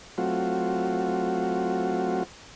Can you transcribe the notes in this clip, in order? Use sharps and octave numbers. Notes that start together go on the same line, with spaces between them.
F#3 A3 C4 F4 F#4